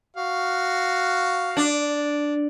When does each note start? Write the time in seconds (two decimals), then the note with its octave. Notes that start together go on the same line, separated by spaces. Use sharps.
0.17 F#4 F5
1.57 D4